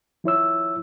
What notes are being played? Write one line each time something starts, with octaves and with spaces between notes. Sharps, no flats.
F3 E4 C#5 E6